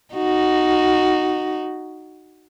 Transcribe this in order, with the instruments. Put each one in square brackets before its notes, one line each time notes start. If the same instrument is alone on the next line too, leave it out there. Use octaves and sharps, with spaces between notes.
[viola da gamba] D#4 F#4